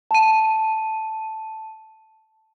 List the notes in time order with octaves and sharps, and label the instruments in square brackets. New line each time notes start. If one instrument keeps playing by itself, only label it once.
[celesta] A5 D#7